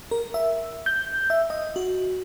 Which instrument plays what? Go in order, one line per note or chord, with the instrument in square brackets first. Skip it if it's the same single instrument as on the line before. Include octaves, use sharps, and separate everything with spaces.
[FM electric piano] A#4
E5
G6
E5
D#5
F#4